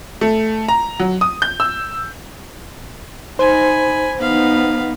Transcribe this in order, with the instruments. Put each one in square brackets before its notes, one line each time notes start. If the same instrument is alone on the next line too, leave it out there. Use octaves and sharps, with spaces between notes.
[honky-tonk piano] A3
A#5
F#3
D#6
G6
E6
[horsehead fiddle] D#4 [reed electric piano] C5 [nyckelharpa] G#5 B5
[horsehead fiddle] B3 D#4 [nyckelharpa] F5 B5